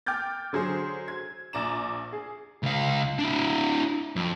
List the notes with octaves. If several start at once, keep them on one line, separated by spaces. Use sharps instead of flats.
G5 D6 F6 G6 A6
D3 F#3 G#4 C5
G#6
A#1 D5 A#5 E7
G#4
C#2 F5
D4 E4
F2